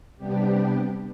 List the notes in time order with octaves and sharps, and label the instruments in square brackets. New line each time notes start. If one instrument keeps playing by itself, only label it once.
[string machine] C3 G3 B3 D4 G4